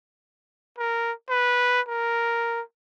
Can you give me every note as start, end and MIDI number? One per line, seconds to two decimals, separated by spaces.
0.78 1.12 70
1.29 1.81 71
1.88 2.61 70